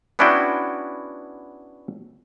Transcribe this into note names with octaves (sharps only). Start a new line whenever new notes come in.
B3 C#4 D4 E4 F#4 G5